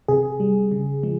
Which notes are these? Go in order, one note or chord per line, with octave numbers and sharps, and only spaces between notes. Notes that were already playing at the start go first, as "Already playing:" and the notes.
C3 G#4
G3
C#3
F3 G#3